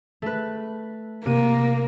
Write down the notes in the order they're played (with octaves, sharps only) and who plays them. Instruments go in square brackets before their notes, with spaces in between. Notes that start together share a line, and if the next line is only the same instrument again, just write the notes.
[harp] A3 B4
[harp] C3 D#7 [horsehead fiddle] A#3